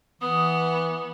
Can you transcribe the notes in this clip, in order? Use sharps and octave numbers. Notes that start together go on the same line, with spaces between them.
E3 B3 D#6